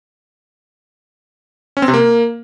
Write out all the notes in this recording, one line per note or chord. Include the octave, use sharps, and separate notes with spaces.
C#4
C4
C3
A#3